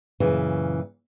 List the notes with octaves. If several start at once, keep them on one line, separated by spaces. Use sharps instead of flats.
F#2 A#2 C#3 E3